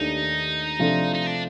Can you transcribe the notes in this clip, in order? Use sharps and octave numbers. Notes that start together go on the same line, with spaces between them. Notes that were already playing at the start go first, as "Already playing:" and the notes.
Already playing: D#2 D#3 A3 D4 D#4 G4
C3 F3 A3 D4 F4
D#4
D4